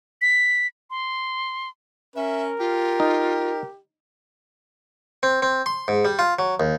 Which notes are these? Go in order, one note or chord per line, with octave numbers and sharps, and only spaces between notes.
B6
C6
C#4 A#4 E5
F4 G4
D#4
C4
C4
C6
G#2
G3
F4
F#3
D#2